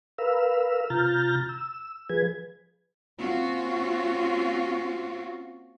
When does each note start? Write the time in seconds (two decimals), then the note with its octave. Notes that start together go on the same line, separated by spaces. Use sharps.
0.18 A#4 B4 F5 E6
0.90 C3 F4 A#5 F6 G6 A6
1.49 E6
2.10 F3 G#4 B4 G#6
3.19 A#3 C4 C#4 F4 F#4